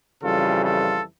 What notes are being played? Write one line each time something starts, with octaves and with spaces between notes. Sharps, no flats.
F2 C#3 E3 G3 F4 A4
F4 A4